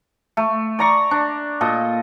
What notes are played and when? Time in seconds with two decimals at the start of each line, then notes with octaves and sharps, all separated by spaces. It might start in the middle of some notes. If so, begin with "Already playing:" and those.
0.37 A3
0.79 D5 A#5 C#6
1.11 D4
1.61 A#2 A4 D#5